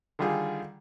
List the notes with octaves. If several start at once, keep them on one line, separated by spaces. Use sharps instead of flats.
D3 D#3 G3 F4 G#4